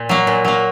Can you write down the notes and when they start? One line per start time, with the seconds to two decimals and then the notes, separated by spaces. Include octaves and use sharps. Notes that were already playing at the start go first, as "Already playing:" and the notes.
Already playing: A#2
0.09 F#3 A#3
0.27 A#2
0.45 F#3 A#3